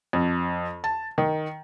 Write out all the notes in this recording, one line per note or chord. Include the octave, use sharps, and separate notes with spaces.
F2
A5
D#3